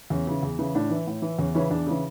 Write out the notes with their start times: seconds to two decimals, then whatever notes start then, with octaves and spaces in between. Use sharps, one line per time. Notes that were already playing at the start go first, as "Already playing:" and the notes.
0.10 E2 C#4
0.27 C#3 E3
0.43 E2
0.59 C#3 E3
0.75 A2 D4
0.91 E3
1.07 A2
1.22 E3
1.39 E2 C#4
1.55 C#3 E3 C#4
1.70 E2 D4
1.87 C#3 E3